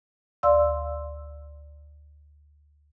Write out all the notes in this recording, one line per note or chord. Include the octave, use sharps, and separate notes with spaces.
D2 D5 F5 C6 E6